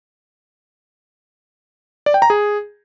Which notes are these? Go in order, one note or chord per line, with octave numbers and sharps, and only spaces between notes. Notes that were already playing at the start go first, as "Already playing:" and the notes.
D5
G5
A#5
G#4